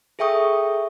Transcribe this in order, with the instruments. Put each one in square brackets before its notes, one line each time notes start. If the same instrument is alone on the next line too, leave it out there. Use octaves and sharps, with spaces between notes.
[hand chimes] G#4 A4 E5 G5 C#6 D#6